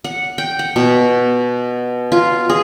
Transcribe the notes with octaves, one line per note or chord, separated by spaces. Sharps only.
F#5
G5
F#5
B2
F4
G#4